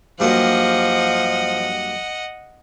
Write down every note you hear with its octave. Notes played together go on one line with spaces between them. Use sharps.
G2 F3 F#3 A#3 D#5 F#5